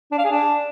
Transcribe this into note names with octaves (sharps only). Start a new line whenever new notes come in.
D4
F5
G#4
D4